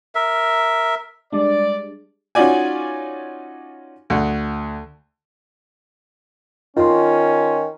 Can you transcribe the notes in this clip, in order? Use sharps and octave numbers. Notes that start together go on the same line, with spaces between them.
A#4 E5
G3 G#3 D4 D5
C#4 D#4 F4 F#4 D5 G#5
D2 F#5
D#3 C#4 F4 C6